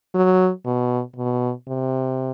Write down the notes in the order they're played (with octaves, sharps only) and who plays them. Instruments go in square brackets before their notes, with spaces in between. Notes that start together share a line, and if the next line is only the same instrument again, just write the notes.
[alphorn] F#3
B2
B2
C3